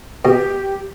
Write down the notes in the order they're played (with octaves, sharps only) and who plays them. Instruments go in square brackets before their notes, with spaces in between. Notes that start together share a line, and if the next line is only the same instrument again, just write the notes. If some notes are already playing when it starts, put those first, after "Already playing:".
[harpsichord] B2 [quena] G4